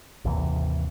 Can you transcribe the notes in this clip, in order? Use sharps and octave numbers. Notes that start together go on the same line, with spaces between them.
G#1 D#2 C3 E3